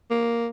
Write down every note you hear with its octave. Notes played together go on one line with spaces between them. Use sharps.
A#3